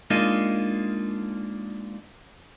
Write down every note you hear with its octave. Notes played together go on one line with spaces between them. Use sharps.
G#3 A#3 D4 D#4 F4